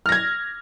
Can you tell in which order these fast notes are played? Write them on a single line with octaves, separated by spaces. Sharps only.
F6 A#6 G#6